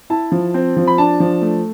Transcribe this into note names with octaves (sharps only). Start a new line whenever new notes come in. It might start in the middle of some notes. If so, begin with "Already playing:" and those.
E4 A5
F3
C4
F3
B5
D4 A5
F3
A3